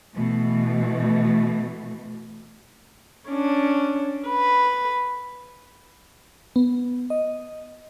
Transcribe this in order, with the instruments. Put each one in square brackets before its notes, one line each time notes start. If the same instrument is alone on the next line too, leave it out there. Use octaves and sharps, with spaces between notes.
[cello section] B2 E3 A3
[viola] C#4 D4
B4
[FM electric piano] B3
D#5